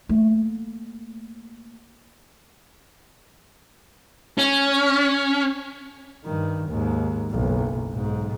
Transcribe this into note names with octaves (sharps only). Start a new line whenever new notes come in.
A3 A#3
C#4
G2 D#3
D#2 G#2
F#1 B1
B1 G#2